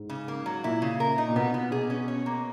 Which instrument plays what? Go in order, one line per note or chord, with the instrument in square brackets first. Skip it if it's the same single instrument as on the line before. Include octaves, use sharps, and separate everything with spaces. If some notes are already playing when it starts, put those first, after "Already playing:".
Already playing: [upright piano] G#2
[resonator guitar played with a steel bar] C#3
A#3
F#3
[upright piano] A#2 [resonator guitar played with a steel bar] E4
[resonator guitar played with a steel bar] C#3
A#4
D#4
[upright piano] A#2
[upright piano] B2 [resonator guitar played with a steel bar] B3
[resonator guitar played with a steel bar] B3
[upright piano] B2 [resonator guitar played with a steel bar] G#4
[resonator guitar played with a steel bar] C#4
C#5
A#3